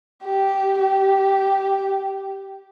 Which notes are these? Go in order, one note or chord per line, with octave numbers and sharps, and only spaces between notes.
G4
G4